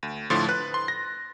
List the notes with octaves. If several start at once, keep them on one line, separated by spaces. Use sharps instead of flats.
D2
A2 D3 F3 C6 A6
B4 F#6
C6
A#6